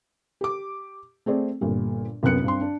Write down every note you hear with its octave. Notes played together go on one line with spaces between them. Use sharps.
G4 D6
A3 C4 G#4 D5
G1 A#2 G3
C2 F#2 B3 F#6 C#7
G2 C4 C6
D4